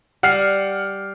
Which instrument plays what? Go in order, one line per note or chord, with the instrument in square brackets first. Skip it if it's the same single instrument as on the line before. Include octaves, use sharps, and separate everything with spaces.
[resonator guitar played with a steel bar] G3 [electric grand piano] F#5 F6 C7